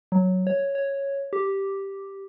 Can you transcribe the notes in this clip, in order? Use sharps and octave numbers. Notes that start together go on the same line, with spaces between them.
F#3
C#5
C#5
G4